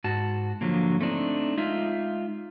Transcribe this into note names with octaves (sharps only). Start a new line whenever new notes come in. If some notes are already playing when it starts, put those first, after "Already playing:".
G#2 F#4 A5
D3 F3 F#3 A#3
A3 C4 D4 D#4
G#3 D#4 F4 E5